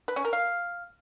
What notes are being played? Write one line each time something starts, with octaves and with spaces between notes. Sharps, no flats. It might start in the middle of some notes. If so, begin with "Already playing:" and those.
B4
C#4
A#4
F5